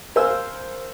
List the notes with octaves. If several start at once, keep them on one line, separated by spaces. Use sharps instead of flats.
A#4 C5 F5 G#5 E6